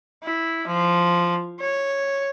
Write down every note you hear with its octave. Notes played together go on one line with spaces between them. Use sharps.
E4
F3
C#5